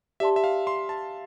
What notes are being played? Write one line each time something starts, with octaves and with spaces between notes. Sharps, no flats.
G4 D5 E5 A5 C6
E5
F5
C6
A5